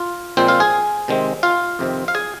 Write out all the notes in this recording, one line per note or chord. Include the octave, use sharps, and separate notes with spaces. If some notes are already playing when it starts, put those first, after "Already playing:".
Already playing: F4
A#2 F3 G#3 C4 C5
F4 F5
G#4 G#5
C3 D#3 G#3 C4
F4 F5
F2 C3 D#3 C4
F5
G#4 G#5